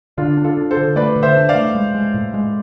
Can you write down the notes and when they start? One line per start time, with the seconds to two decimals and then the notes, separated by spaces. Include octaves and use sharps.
0.18 D3 D4 F4
0.37 D4
0.44 F4 A4
0.57 D4
0.71 A4 C5
0.77 D3
0.96 A3 B4 D5
1.16 D3
1.23 C5 E5
1.36 D4
1.49 D5 F5
1.55 A3
1.75 G#3
1.95 G#3
2.14 A2
2.34 G#3